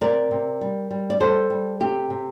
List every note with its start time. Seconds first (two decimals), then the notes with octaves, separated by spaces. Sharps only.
0.01 C3 A#4 D5
0.31 C3
0.61 G3
0.91 G3
1.10 D5
1.20 G3 A4 C5
1.50 G3
1.80 C3 G4
2.10 C3